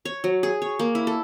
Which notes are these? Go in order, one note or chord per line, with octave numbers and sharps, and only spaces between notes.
C#5
F#3
G#4
C#5
A#3
E4
A4